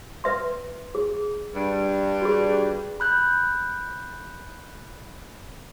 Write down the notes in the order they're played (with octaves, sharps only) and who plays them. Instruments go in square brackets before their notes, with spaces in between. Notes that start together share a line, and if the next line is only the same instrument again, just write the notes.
[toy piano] B4 E5 C6
G#4
[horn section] G2 G3
[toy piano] F#4 G#4
[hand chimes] B5 F#6 G6